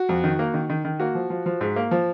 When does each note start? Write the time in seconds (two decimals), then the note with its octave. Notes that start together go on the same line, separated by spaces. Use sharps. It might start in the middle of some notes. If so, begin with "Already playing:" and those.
Already playing: F#4
0.09 F2
0.24 D#3
0.39 A#3
0.54 D#3
0.70 D#3
0.85 D#3
1.00 A#3 F#4
1.15 F3
1.30 F3
1.46 F3
1.61 G#2
1.76 A#3
1.91 F3